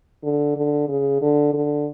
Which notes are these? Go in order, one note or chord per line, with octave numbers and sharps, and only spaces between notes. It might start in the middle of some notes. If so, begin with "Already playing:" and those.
D3
D3
C#3
D3
D3